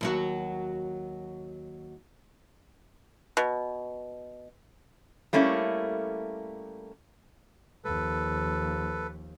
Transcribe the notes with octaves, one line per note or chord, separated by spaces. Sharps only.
D#2 F#3 F#4
B2
G3 A3 A#3 C#4 E4
D#2 F3 A4 B4